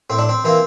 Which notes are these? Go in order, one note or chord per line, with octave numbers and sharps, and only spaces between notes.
A2 C4
D4
C4
E3 A#3 C4